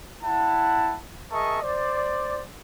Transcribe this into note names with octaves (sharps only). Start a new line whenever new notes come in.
E4 F#5 A5
G#4 A#4 D#5 E5 A5 C#6
C5 D5